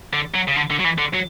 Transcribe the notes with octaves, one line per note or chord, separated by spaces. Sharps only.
D3
F#3
C#3
D3
D3
F#3
E3
D3
F#3